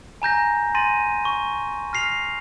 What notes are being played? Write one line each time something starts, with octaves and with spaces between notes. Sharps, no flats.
G#5 A#5 G6 A#6
G#5 C6 A6 A#6 D#7
C#6
F6 A#6 C7 F7